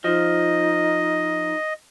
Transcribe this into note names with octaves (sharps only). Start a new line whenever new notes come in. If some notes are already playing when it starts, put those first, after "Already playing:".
F3 D#4 D#5